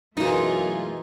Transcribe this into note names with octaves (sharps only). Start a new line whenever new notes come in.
F#2 B2 D#3 E3 A3 D#4 F4 G#4